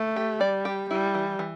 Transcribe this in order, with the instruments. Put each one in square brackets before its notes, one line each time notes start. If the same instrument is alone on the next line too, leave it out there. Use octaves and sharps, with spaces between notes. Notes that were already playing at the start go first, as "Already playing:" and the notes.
Already playing: [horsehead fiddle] A3
[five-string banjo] G4
[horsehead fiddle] G3 [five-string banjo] D5
[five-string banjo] G4
[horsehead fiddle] G3 [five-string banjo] E4
[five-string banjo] E3
E3